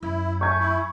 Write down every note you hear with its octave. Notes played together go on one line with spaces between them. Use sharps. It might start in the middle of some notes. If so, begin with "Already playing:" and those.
F#2 E4
A3 E5 G#5 C#6 G6 G#6
E4